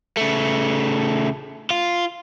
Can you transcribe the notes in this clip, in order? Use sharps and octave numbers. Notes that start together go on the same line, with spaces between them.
C#3 A3
F4